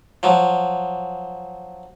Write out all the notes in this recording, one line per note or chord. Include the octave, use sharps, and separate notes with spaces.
F3 F#3